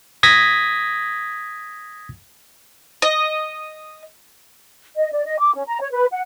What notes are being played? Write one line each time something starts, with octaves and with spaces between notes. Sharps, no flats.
D#6 G#6 A#6 B6
D#5
D#5
D5
D#5
D6
C#4
A#5
C#5
B4
F#5